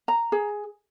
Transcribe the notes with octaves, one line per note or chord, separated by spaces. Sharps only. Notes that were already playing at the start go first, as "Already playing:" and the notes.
A#5
G#4